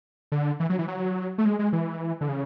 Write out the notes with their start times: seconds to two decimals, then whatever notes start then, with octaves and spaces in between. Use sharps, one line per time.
0.32 D3
0.60 E3
0.69 F#3
0.79 E3
0.88 F#3
1.38 A3
1.45 G#3
1.59 G#3
1.73 E3
2.21 D3
2.29 C#3